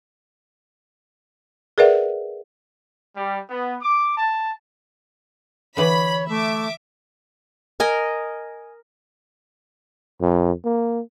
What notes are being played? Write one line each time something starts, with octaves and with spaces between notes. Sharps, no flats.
G#4 A#4 B4 D5 E5 F#5
G3
B3
D6
A5
D3 E3 C#5 D5 B5
A3 E5 D6
A#4 D#5 G#5
F2
A#3